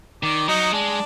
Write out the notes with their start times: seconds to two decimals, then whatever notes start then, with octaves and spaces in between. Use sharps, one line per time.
0.23 D#3 D5
0.48 F#3 D#4
0.73 G#3 D4